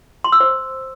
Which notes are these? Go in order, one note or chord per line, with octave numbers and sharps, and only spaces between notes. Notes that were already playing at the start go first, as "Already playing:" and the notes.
C6
E6
C5